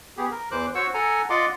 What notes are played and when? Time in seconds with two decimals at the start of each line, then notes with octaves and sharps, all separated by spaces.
0.17 B3 G4 G#4
0.31 A#4
0.51 E2 E3 C5 D6 F#6
0.75 F#4 C5 C#5 F#5 C#6 E6
0.94 A4 F#5 G#5 A#5
1.30 F4 D5 D#5 F#5 C6 D6